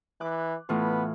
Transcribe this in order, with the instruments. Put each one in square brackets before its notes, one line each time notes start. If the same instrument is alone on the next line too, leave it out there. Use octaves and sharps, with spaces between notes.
[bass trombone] E3 [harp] D6 F#6
[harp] A2 E3 F4 [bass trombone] B3